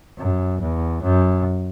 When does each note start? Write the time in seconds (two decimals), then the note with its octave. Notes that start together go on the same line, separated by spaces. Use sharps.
0.18 F#2
0.61 E2
1.03 F#2